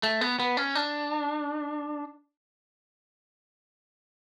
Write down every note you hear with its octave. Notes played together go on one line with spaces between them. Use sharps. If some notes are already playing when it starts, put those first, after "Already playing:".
A3
B3
B3
C#4
D4